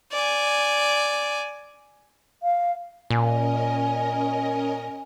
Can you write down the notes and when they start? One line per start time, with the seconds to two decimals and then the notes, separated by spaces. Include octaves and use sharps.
0.12 D5 G#5
2.43 F5
3.10 A#2 C#4 A#4 D#5 G#5